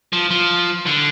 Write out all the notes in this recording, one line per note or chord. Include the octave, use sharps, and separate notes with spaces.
F3
F3
D3